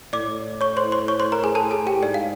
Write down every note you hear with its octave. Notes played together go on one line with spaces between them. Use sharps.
A2 D5 D6
C#5 C#6
C5 C6
C5 C6
C#5 C#6
C5 C6
A#4 A#5
G#4 G#5
A4 A5
G#4 G#5
G4 G5
G#2 D5
F5